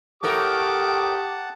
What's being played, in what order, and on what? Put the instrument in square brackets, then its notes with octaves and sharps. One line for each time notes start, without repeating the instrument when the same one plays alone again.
[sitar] A2 A4 A#4 [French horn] G4 [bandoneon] F#5 A5 [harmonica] D6 D#6